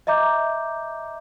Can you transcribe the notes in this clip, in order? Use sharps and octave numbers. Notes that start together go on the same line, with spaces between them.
D#5 E5 A#5 D6 G6